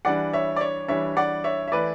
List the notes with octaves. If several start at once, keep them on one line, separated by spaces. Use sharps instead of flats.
E3 G3 D4 D5 F#5
C#5 E5
D5
C#5
E3 G3 D4 C#5 E5
D5 F#5
C#5 E5
E5
E3 A3 E4 B4 D5